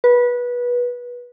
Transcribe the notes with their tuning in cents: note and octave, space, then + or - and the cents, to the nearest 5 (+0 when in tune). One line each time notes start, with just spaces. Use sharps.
B4 -20